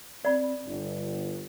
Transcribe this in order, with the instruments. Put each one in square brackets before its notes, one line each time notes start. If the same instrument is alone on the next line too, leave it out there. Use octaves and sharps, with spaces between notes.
[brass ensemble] C4 [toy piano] D5 B5
[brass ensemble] G1